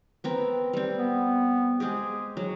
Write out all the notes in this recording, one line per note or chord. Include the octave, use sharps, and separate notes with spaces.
B3 C4 A#4
G3 C4
B3
G#3 C4 G4 G#4
F#3